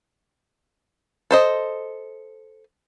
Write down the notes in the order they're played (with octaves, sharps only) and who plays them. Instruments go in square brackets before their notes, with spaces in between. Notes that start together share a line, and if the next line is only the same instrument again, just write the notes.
[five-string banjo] A4 C5 D#5